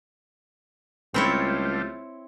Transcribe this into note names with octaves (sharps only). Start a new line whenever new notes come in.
C#2 G3 A3 C4 E4 F4 C#5